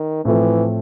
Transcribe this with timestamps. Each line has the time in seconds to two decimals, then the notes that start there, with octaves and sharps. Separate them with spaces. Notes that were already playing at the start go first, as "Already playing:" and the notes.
Already playing: D#3
0.25 A2 E3 F3 A3 C4